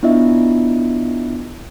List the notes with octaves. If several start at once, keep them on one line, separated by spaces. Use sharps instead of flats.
B3 D4 E4 F4 D#5 E5